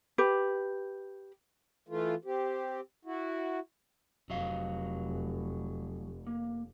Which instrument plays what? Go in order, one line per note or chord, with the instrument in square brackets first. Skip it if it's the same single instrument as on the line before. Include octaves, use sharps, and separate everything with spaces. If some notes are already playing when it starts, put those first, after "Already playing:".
[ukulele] G4 B4
[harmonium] E3 A3 F4
C4 G4
E4 F#4
[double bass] F1 [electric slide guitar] F#3 D#5 F5
[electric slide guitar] A#3